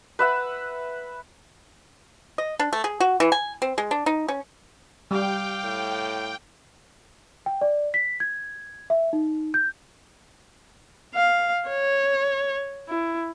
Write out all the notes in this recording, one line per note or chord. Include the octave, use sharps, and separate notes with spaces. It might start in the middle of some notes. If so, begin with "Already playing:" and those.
B4 E5 F#5
D#5
D4
A3
G#4
F#4
E3
G#5
C4
G#3
D4
D#4
C#4
G3 F5 G5 D6
A2
G5
D5
B6
G#6
E5
D#4
G6
F5
C#5
E4